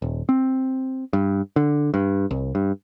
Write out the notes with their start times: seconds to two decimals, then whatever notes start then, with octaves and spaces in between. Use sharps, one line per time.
0.02 D#1
0.29 C4
1.13 G2
1.56 D3
1.94 G2
2.31 C2
2.55 G2